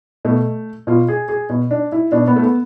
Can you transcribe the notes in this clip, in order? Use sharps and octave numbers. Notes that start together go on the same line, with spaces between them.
B2 A3
B2 F4
G#4
G#4
B2
D4
E4
B2 D4
B3
A3
B3